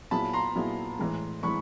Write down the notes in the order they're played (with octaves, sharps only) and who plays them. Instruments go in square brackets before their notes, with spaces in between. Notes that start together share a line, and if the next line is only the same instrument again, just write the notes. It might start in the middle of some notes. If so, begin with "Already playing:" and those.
[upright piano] A#2 F#3 B3 E4 G#4 [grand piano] A5 B5
[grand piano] A#5 C6
[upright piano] A#2 F#3 B3 E4 G#4
A2 E3 G#3
[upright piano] A2 E3 G#3 [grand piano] B5 C#6